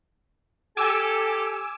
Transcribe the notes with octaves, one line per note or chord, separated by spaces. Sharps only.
G4 A4 G#5 D6 E6